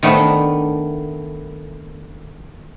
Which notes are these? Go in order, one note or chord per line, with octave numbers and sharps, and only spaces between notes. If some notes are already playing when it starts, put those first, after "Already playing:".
D#3 A3 B3 D4